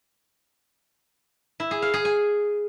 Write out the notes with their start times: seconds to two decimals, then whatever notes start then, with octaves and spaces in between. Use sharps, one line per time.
1.60 E4
1.71 G#4
1.82 F5
1.94 G#4
2.05 G#5